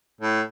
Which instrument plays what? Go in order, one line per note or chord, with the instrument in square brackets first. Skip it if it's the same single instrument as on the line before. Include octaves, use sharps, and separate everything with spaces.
[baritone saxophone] A2